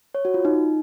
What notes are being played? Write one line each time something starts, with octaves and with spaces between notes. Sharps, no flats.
C#5
F#4
F4
D#4